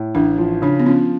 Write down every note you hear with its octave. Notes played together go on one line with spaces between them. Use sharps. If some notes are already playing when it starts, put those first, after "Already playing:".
Already playing: A2
A1 D4
F3
C#3 D4
B3
F3 C#4